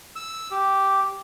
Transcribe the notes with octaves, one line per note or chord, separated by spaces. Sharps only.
E6
G4